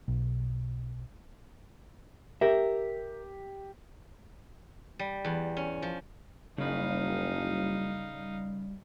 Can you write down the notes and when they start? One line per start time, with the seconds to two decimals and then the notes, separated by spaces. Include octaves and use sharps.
0.08 B1
2.41 G4 A#4 E5
4.99 G3
5.25 E2
5.57 C#4
5.82 F3
6.58 F#1 C#3 G3 D#4 F5 B5